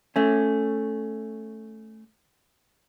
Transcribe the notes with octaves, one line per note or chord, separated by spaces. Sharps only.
A3 C#4